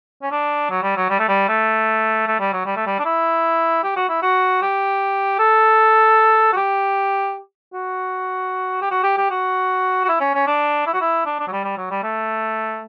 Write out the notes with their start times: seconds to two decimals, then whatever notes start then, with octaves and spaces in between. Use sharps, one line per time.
0.22 C#4
0.31 D4
0.70 F#3
0.83 G3
0.97 F#3
1.10 G3
1.19 A3
1.28 G3
1.48 A3
2.27 A3
2.40 G3
2.53 F#3
2.66 G3
2.76 A3
2.86 G3
2.99 D4
3.05 E4
3.83 G4
3.96 F#4
4.09 E4
4.22 F#4
4.62 G4
5.39 A4
6.52 F#4
6.56 G4
7.74 F#4
8.82 G4
8.91 F#4
9.04 G4
9.17 G4
9.31 F#4
10.04 F#4
10.09 E4
10.21 C#4
10.35 C#4
10.47 D4
10.86 E4
10.93 F#4
11.01 E4
11.25 D4
11.39 D4
11.47 F#3
11.52 G3
11.64 G3
11.78 F#3
11.91 G3
12.03 A3